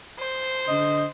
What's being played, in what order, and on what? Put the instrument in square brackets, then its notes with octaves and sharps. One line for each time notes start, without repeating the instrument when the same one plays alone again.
[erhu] C5
[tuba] D3 [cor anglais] D#5